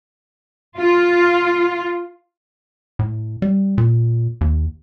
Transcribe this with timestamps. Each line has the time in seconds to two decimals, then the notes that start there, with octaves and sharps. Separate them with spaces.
0.77 F4
2.99 A2
3.42 G3
3.78 A#2
4.41 D#2